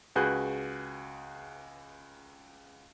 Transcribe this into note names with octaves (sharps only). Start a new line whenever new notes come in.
C#2 F#4 G#4 B4 F#6 G6